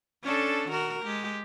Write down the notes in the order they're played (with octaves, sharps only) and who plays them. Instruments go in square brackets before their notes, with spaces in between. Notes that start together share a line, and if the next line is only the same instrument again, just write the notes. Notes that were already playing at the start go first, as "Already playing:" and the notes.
[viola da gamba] C#4 D4 A4
D#3 F#4 A#4
G#3 G4